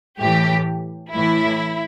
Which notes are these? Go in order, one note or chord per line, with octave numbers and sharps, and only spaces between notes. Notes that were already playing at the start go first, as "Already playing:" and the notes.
A2 E3 G4
A2 E3 E4